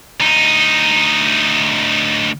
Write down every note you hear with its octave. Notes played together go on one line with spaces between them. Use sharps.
D2 D#4